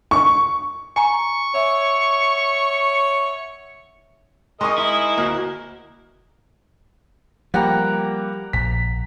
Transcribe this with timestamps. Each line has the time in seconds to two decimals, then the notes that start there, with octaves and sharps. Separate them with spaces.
0.11 C#6
0.96 G#5 A#5 C#6
1.54 C#5 E5 F#5 E6
4.61 G#3 A#4 D#5 G#5 C6 C#6 D#6
4.78 E4
5.17 D1 A#3 F#4 A#5
7.54 F3 G3 A#3 F#5 G5 A#5
8.53 A#1 B6